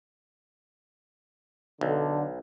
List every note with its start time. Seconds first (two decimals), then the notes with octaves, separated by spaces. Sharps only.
1.81 B1 D3